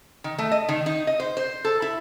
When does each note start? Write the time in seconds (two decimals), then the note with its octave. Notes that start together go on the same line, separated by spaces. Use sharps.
0.24 D#3
0.38 A3
0.52 D#5
0.69 D#3
0.86 D#4
1.07 D#5
1.20 C5
1.37 C5
1.65 A4
1.82 E4